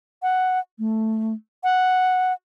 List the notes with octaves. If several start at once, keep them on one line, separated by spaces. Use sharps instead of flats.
F#5
A3
F#5